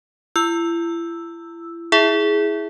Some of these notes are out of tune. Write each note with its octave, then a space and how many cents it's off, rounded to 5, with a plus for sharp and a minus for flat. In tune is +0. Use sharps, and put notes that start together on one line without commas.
E4 +40 E6 +0
E4 -10 G#4 +5 E5 +0